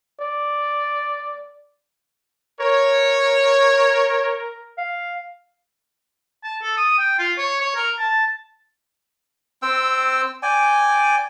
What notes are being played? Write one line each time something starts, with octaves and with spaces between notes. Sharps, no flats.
D5
A#4 C#5
F5
A5
A4
D#6
G5
F4
C#5
C#5
A#4
A5
C4 G5 E6
D5 G5 G#5